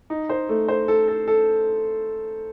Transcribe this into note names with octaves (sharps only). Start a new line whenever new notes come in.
D#4
C5
A3
C5
A4
A4
A4